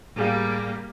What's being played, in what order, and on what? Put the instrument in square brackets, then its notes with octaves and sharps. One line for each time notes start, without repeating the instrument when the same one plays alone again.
[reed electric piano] A2 G#4 F5 [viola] G3 A#3